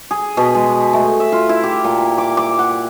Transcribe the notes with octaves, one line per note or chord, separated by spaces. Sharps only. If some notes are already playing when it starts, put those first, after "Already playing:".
G#4
B2
G#3
A3
E5
F4
E4
G4
A#2
D6
D6
F#5